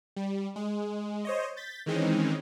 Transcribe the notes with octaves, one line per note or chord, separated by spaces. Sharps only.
G3
G#3
C5 C#5 D#5
G6 A6 B6
D#3 E3 G#3 C4 C#4 D#4